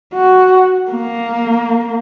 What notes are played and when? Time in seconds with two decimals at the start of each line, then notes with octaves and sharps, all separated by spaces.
0.13 F#4
0.92 A#3